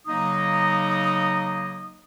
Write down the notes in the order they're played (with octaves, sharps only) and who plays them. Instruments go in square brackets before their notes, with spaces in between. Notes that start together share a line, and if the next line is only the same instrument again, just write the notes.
[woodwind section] C#3 F#3 A#3 D#4 D#5 D#6